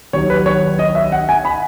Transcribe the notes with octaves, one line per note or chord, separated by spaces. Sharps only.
D#2 D#3 F#3 C#5
B4
C#5
D#5
E5
F#5
G#5
B5